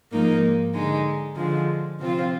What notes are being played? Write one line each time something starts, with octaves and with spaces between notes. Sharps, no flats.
G#2 F3 A#3 D#4 A#4
D3 G#3 D#4
D3 F3 G#3
C3 F3 C4 F4